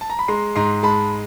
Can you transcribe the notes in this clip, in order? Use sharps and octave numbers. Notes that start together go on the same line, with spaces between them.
A5
A#5
B5
G#3 A#5 C6
G#2 A#5 C6
G#3 A5 B5